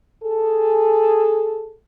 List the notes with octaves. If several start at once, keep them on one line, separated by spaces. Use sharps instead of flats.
G#4 A4